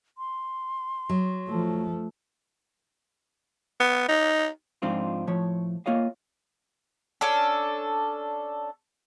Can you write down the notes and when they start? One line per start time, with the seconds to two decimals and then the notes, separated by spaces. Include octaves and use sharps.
0.18 C6
1.09 F#3
1.49 F3 A3
3.80 B3
4.08 D#4
4.82 G#2 F3 C4 D4 D#4 F4
5.27 A2 F3 C#5
5.86 A#3 F4 C#5 D#5 F5
7.21 C#4 D4 A4